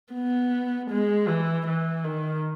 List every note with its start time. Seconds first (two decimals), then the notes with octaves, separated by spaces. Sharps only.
0.13 B3
0.90 G#3
1.28 E3
1.67 E3
2.04 D#3